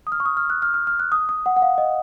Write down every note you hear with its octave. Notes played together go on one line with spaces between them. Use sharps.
D#6
F6
C#6
D#6
F6
F#6
F6
F6
F6
F#6
D#6
D#6
F#5
F#5
F5
D#5